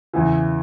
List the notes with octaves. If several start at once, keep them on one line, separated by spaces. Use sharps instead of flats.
E2 C#3 E3